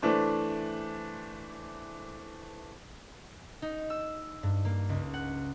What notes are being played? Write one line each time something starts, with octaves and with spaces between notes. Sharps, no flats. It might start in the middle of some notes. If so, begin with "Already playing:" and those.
E3 A3 D4 C5
D#4
E6
G2
A#3
C#2
F#5